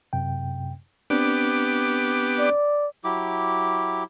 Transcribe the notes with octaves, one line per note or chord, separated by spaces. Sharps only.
F#2 C3 G5
B3 C4 D4 G4 D6
D5
F#3 E4 G4 D6